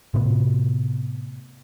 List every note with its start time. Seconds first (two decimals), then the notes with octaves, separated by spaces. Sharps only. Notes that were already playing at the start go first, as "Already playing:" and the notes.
0.14 A2 C3 A3 B3